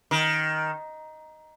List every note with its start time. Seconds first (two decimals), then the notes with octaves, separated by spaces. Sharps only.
0.11 D#3